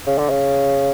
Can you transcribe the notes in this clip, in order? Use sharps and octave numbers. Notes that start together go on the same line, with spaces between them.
C#3
D3
C#3